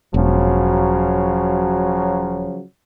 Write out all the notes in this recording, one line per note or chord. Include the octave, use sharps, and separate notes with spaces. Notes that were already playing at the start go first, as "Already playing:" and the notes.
E1 C#3 F3 F#3